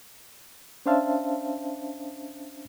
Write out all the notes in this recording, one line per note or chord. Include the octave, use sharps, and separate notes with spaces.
C#4 D4 C5 E5 F5 A5